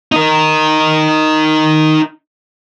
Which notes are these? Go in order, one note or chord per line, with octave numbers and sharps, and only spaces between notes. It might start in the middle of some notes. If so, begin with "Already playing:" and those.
D#4 A#4